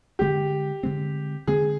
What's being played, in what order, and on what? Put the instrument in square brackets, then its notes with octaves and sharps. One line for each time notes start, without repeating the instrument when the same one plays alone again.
[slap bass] D3 G#3 C4 [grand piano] G4
[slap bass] D3 G#3 C4
[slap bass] D3 G#3 C4 [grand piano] G#4